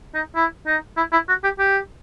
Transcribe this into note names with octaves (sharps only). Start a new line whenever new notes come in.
D#4
E4
D#4
E4
E4
F#4
G4
G4